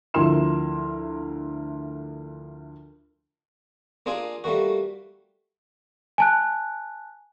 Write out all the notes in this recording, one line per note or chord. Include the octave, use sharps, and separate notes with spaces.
D2 F3 E4 A#4 C6 E7
A#3 D4 F4 G#4 G#5
G3 A3 A#3 F#4
G#5 A5 F#6